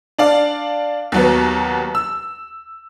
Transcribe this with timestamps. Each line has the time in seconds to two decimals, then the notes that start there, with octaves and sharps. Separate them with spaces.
0.18 D4 D5 F5
1.12 D#2 F#3 B3
1.95 E6